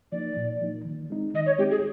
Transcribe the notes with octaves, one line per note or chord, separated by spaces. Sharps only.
F3 A#3 D#4 D5
A#2
F3 A#3 D#4
D#3
G#3 C4 D#4
D#3 D#5
C#5
G#3 C4 D#4 G4
G#4